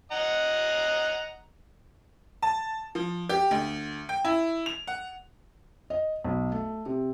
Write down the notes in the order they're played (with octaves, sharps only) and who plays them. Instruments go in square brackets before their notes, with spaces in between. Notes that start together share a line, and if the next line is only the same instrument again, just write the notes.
[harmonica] D#5 F#5 A#5
[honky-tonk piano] A5
F3
G4
D2
G5
E4
F7
F#5
[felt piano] D#5
B1
A3
C3